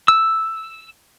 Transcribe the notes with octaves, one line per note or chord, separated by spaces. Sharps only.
E6